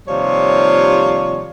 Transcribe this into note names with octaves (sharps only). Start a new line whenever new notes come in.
D#2 C3 F3 G3 F4 C#5